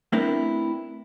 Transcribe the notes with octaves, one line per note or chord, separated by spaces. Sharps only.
A3 C4 D4 E4 A#4 B4